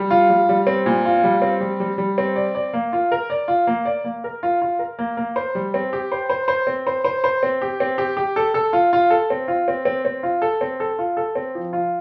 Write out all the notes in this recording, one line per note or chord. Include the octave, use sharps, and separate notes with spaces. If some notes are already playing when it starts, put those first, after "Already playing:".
Already playing: G3
F4
G3
G3
C4
A#2
F4
G3
C4
G3
G3
G3
C4
D5
D5
A#3
F4
A#4
D5
F4
A#3
D5
A#3
A#4
F4
F4
A#4
A#3
A#3
C5
G3
C4
G4
C5
C5
C5
C4
C5
C5
C5
C4
G4
C4
G4
G4
A4
A4
F4
F4
A4
C4
F4
C4
C4
C4
F4
A4
C4
A4
F4
A4
C4
F3
F4